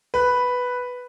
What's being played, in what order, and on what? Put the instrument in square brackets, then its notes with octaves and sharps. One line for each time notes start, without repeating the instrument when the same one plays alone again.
[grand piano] B4